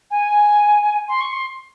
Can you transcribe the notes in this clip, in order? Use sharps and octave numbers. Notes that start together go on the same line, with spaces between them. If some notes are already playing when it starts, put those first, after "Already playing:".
G#5
C6
C#6
C6